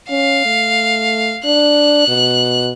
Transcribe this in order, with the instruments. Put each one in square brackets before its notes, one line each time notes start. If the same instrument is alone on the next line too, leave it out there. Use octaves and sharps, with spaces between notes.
[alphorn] C#4 [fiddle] F5
[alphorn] A3
[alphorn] D4 [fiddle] F#6
[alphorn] B2